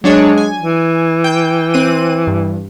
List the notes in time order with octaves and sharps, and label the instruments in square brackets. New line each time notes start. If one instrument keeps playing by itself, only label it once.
[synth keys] F#3 D4 C#5 [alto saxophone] G#3
[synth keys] G#5
[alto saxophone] E3
[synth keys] G5
C4 F#6 D#7
G2